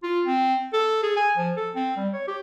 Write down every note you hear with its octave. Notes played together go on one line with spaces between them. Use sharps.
F4
C4
A4
G#4
G#5
F3
A4
C4
G3
C#5
G4